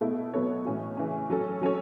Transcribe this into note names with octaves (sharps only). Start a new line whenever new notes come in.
B2 A3 E4
B2 F#3 B3 A4 C#5
A2 E3 C#4 F#4
C#3 E3 C#4
F#3 C#4 A4
F#3 C#4 A4 C#5